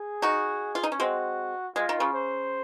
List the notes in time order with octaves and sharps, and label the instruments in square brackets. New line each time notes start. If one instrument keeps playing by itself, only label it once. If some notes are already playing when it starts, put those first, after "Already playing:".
Already playing: [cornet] G#4
[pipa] D#4 F#4
F4
D#4
C#4
[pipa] G#3 C4 [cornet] F#4
[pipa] G#3 [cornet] F4
[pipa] D#3
C#3
[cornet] C5